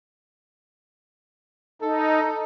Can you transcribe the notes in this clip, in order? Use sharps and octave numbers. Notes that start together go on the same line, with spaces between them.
D#4 A4